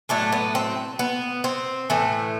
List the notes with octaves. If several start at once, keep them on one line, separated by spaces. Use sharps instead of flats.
A2 F#3 A3 D4
B3
C4
B3
C4
A2 E3 A3